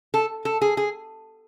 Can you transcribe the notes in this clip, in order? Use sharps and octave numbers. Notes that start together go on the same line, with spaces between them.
A4
A4
G#4
G#4